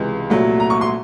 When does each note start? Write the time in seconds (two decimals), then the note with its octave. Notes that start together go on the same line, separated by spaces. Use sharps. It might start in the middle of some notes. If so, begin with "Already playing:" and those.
Already playing: C#2 C3 E3 G#3
0.30 C2 A#2 F#3 A3
0.60 A#5
0.70 C#6
0.81 C6